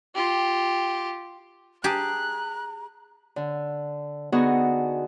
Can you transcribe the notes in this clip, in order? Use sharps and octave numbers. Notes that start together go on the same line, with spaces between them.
F4 G4
G4 G#4 A5 A#5 F#6
D3
D3 B3 D#4 F#4 G#4 C#6